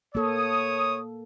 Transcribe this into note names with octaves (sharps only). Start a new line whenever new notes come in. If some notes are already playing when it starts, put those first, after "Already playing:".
A#3 A4 C#5 D#6